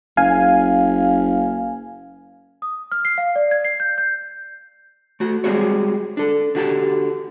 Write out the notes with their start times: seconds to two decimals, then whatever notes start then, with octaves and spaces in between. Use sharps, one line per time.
0.17 F#1 F5 G#5
2.62 D#6
2.92 F6
3.05 C7
3.18 F5
3.36 D5
3.51 G#6
3.64 C7
3.80 G6
3.98 G6
5.20 A3 F#4
5.44 G3 G#3 C4 F#4 G#4 C#5
6.17 D4 A4
6.55 D3 F#4 G4 A5